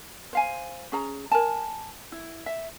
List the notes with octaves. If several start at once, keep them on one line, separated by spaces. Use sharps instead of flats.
C5 F5 G#5
C#4 G#4 A#5
A#4 G#5 A5
E4
E5